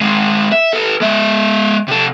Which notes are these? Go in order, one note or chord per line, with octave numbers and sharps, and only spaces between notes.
G#3 C4
E5
A4 B4
G#3 E5
C3 A4